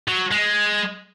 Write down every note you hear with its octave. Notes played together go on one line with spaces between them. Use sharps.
F#3
G#3